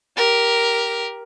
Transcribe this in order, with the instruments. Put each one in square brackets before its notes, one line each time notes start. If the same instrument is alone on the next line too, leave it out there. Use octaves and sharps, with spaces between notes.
[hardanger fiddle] G4 A#4